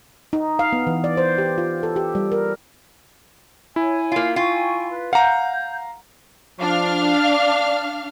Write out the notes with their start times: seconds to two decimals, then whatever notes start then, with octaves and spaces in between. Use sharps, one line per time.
0.33 D#4
0.59 F5
0.73 B3
0.87 E3
1.04 D5
1.17 C5
1.38 G4
1.58 F4
1.83 A4
1.96 G4
2.15 G3
2.32 A#4
3.76 E4 C#5 G#5
4.12 A#3 F4
4.36 F4 G5 G#5 C#6
4.90 B4
5.13 F5 F#5 A#5 G6
6.60 F3 D4 F5 F6
7.25 D5